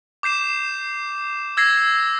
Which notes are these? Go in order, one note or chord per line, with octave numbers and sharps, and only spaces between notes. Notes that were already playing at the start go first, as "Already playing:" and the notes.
D6 G6 C7 E7
E6 G#6 A#6 C7